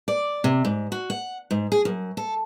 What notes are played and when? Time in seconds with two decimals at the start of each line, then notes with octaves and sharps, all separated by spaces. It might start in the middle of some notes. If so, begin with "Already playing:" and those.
0.08 D5
0.44 C3
0.65 G#2
0.92 F#4
1.10 F#5
1.51 G#2
1.72 G#4
1.85 F#2
2.17 A4